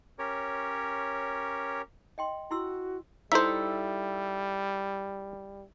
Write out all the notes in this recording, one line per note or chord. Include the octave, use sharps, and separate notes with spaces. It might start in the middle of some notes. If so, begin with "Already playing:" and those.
C#4 G4 A#4 C#5
D#5 G5 C6
E4 F#4 C6 E6
G3 D#4 E4 A4 C5 E5